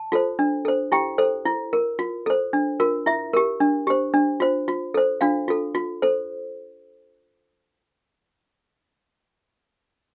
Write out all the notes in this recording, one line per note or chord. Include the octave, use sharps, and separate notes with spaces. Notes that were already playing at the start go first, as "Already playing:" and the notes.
Already playing: A5
F4 A4 C5
D4
A4 C5
E4 G4 G5
A4 C5
E4
A#4
F4
A4 C5
D4
F4 A#4
E4 E5
G4 A#4
D4
G4 C5
D4
F4 C5
F4
A4 C5
D4 F4 F5
F4 A4
F4
A4 C5